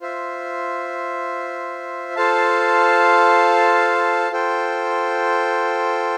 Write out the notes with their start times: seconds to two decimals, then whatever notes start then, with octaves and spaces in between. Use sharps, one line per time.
0.01 F4 C5 E5
2.16 F4 A4 C5 F5 A5
4.31 F4 A4 C5 G5